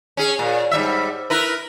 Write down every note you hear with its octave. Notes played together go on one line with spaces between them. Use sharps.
C#4 G#4
A#2
G#2 G3 E5
E4 A#4 B4